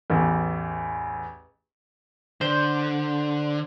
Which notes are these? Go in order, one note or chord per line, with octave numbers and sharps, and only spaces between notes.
A1 E2
D3 C5